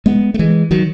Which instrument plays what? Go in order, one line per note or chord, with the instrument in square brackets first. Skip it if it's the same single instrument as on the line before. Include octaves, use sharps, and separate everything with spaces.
[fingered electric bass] G#3 B3
A3
E3 G#3
D#3 F#3